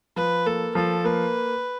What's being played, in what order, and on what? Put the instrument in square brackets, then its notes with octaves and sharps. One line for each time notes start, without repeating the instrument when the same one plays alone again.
[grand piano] F3 [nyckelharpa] B4
[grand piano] A#3 [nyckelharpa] A4
[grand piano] F3 [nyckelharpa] A4
[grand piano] A#3 [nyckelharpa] B4